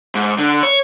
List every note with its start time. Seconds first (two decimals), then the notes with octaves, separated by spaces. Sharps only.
0.15 G#2
0.39 D3
0.63 C#5